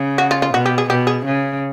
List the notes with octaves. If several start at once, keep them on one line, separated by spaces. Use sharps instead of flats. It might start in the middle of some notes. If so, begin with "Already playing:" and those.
Already playing: C#3
F#4
F4
F4
B2 F#4
G4
G#4
B2 G4
G#4
C#3